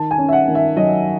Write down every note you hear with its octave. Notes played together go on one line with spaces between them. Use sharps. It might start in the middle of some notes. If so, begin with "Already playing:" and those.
Already playing: D#3 A5
G#5
C#4
E5
F#5
D#3
E5
F#3 D#5